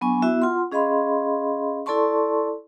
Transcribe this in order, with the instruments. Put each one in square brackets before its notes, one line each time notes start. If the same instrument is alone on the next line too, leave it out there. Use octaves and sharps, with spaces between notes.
[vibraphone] F#3 B3 D4 G#5 C#6
B3 E4 F#4 E5
F4 F#5 C6
C#4 G#4 D#5 F5 B5 C6
E4 A4 D5 A5 C6 C#6